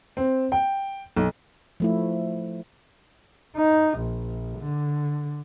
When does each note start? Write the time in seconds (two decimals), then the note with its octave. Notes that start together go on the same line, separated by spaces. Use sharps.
0.17 C4
0.52 G5
1.17 B1
1.80 F3 A3 E4
3.56 D#4
3.98 A#1
4.59 D3